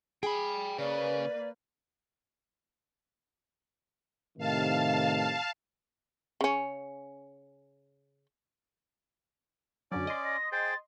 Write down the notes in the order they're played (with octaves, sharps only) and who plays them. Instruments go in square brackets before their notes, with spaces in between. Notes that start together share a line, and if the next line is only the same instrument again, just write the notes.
[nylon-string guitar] G#4 [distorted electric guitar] G5 B5
[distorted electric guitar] C#3 [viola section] A#3 B4 [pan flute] D5
[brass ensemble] A2 C3 D#3 [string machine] F5 A5
[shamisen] C#3 C#4
[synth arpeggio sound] F#2 D3 F#3 [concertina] C#4 D5
[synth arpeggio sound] D#5 C6 [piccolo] D6
[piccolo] A#6
[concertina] G#4 C5 G5 [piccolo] A6